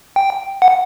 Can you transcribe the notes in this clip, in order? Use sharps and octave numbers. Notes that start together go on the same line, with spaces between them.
G5
F#5